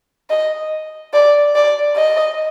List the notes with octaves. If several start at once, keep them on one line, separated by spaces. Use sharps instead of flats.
D#5
D5
D5
D#5